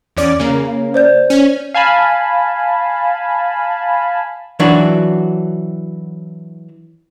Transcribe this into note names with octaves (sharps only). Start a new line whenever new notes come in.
E2 C#4 D5
C#3 A#3
C5 D5 G6
C#4
F5 G#5 A5 B5
E3 F#3 D4 F#4